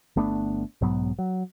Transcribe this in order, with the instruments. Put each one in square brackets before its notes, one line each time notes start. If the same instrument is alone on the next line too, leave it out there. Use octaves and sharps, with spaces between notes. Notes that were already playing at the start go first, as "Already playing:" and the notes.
[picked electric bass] G1 A3 B3 D4
B1 G#2 F#3 B3
F#3